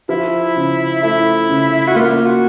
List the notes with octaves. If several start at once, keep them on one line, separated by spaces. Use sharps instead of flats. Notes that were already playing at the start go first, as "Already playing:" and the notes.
F3 E4
C#3
A3 E4
C#3
F#4
A#3 F4
F#4